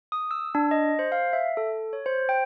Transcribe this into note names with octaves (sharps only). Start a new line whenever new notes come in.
D#6
E6
D4
D#5
C5
F5
E5
A4
C#5
C5
G5